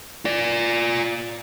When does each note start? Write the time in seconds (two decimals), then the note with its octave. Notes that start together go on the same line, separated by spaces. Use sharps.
0.25 F4 D5